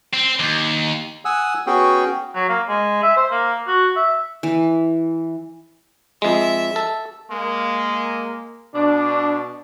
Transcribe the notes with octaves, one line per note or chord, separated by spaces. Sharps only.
C4
D#2
F#5 G#5 D#6 E6
B3 C#4 F#4 G#4 G5
F#3
A#3
G#3
E5
C5
A#3
F#4
E5
E3
F2 G#3 E5
A4
G#3 A#3
B2 D4